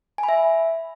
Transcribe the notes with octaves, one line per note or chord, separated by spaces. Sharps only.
G#5
B5
E5